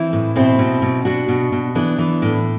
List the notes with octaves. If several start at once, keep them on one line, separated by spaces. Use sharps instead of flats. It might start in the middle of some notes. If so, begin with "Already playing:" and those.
Already playing: E3 C4 E4
A2
B2 C4 E4
B2
B2
B2 D4 F#4
B2
B2
E3 B3 D4
E3
A2